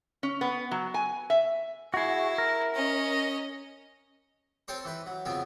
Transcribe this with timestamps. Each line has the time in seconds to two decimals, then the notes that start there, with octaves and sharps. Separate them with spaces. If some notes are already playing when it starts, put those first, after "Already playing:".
0.23 C#4
0.41 B3
0.71 F#3
0.94 G#5
1.30 E5
1.94 E4 F#4 G#4
2.38 A#4
2.74 C#4 D#5
4.68 C4 A4 C5 C#5
4.85 E3 B4
5.06 F#3
5.25 F2 C#3 B3 C4